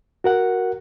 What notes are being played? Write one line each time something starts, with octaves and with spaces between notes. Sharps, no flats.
F#4 A#4 F#5